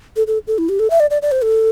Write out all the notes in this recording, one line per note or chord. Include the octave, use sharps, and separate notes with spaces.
A4
A4
A4
E4
G4
A4
E5
D5
D5
D5
C5
A4